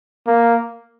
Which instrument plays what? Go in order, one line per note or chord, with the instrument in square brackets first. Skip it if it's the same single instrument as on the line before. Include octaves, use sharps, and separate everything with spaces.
[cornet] A#3